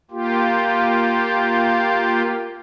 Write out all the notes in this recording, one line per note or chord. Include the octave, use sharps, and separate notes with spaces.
A#3 F4 G4